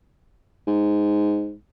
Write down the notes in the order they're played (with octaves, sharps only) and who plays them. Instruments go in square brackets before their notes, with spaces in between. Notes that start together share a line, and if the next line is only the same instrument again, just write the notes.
[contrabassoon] G#2